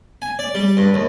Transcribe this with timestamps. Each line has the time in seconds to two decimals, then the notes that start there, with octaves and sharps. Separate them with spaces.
0.22 G#5
0.39 D5
0.55 G3
0.77 G2
0.94 D#2